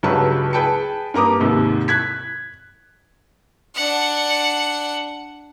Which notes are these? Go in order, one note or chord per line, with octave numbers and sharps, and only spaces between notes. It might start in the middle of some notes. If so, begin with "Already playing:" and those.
C#2 G2 F#3 G#4 B4 A5
G#4 B4 G5 A5 C#7
G2 A#3 A#5 D6 D#6
D#2 G#2 C3
F#6 G#6 B6
D4 F#5